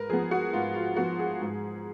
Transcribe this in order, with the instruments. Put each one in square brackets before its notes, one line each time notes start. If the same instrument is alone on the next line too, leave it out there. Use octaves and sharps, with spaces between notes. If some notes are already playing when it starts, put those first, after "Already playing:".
Already playing: [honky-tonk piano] G#2 A#4 B4
F3 B3 G#4
F#4
G#2 F4
F4
F3 B3 F#4
G#4
G#2